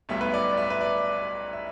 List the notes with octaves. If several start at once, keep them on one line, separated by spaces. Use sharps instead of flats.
B1 A2 G3 B3 E5
B4
D5
D5
E5
B4
D5
E5